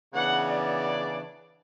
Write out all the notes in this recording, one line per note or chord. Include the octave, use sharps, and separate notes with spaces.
C#3 E3 B3 D4 F#5
D5